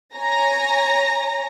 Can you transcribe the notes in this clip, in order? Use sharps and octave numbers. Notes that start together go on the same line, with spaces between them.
C#5 G#5 A#5 A#6